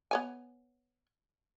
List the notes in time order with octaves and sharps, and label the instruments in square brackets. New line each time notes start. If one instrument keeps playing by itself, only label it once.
[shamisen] B3 C#5 G#5